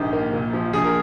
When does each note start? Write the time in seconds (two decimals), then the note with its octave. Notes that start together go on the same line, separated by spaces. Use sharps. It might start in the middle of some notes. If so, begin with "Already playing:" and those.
Already playing: A#1 G#2 D#3 D#4 G4 G#4
0.13 A#3
0.33 A#2
0.53 F3
0.73 A#1 G#4
0.84 A#4